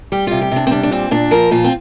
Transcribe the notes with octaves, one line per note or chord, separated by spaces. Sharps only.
G3 G4
C3 F4
G4
C3 D4
C4
G3 D4
D4
A#2 C4
A#2 D4
F3 A#4
A#2 F4
C4